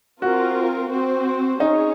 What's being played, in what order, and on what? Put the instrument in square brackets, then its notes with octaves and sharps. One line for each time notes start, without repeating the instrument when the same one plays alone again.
[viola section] C4 F4 A#4 [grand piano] F#4
[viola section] C4 F#4 C5
[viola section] C#4 G#4 C#5 [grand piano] D#4